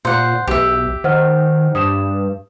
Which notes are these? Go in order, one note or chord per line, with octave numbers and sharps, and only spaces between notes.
A#2 C5 F#5
B1 G4 E5
D#3 C5 F#5 F6
G2 D#6 E7